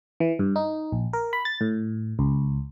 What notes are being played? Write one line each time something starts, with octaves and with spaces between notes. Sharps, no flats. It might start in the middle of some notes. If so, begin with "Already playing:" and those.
E3
G2
D#4
A#1
A#4
B5
A6
A2
C#2